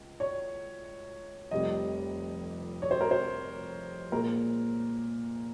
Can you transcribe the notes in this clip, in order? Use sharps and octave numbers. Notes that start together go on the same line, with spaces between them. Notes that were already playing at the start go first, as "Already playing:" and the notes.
Already playing: C#2
C#5
F1 F2 C3 G3 D#5
C#5
C5
A#4
C5
A#2 G#3 A#4